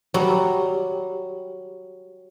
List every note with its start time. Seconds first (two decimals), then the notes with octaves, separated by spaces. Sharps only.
0.14 F#3 G3